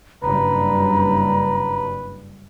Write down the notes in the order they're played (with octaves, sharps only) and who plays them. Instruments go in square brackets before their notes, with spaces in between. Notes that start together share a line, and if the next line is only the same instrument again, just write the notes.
[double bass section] F#1 G2 G3 [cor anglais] B4 [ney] A#5